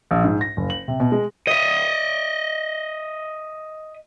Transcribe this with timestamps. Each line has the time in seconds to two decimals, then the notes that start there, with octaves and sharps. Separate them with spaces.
0.11 A#1
0.24 G#2
0.41 A#6
0.57 F#1
0.70 F#7
0.88 C3
1.00 B2
1.12 G#3
1.48 D#5 E5